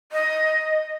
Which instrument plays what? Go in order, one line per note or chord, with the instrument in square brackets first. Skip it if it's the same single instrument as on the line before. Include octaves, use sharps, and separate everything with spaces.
[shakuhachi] D#5